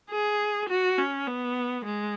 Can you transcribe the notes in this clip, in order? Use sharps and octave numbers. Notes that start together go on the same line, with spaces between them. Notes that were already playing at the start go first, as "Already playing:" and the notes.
G#4
F#4
C#4
B3
G#3